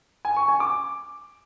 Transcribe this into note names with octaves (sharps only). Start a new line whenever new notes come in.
G#5
C#6
G#5
D6